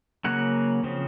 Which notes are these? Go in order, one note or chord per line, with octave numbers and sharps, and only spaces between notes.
C#3 F#3 A#3 C#4 F#5
C#3 F3 C4